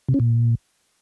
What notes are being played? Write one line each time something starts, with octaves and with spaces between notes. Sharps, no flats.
C3
C#4
A#2